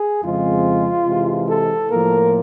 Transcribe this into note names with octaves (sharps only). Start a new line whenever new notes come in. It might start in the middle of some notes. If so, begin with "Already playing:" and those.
Already playing: G#4
F2 C#3 F3 G#3 C4 F4
C3 E3 G#3
A4
A2 F3 A#3 A#4